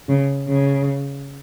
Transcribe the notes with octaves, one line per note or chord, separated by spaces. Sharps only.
C#3
C#3